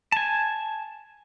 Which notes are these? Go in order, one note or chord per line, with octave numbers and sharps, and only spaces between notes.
G#5 A5